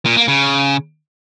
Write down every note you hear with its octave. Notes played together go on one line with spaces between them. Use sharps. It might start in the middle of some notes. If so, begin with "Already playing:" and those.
A#2
A#3
C#3